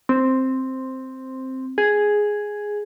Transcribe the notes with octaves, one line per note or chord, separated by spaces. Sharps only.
C4
G#4